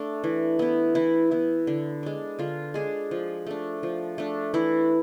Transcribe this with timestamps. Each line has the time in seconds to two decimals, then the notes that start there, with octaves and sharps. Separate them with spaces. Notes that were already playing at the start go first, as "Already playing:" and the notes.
Already playing: A3 D4
0.24 E3
0.59 B3 E4
0.95 E3 E4
1.31 B3 E4
1.67 D3
2.03 G#3 D4
2.39 D3 F4
2.74 G#3 D4 G#4
3.11 F3
3.47 A3 D4
3.83 F3
4.18 A3 D4
4.54 E3 E4